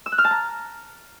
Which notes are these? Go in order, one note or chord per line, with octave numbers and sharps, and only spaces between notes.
E6
F#6
F6
A5
A#5